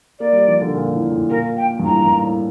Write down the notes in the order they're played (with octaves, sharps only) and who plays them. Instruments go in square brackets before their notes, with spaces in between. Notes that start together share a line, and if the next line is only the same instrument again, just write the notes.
[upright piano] A#3 [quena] D5
[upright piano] G3
F3
D3
A#2
A2
A2
[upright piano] A#2 [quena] A#4
[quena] G5
[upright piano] G2
[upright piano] A2 [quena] A#5
[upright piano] G2
A2